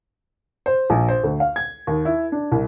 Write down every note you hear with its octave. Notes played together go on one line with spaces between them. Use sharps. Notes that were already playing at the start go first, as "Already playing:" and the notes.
C5
A#1
C5
D2
F5
G#6
D#2
E4
D4
C2